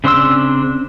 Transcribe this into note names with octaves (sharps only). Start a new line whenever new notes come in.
C#3 C4 D4 C6 E6